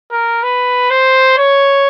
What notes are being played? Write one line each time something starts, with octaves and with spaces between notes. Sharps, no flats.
A#4
B4
C5
C#5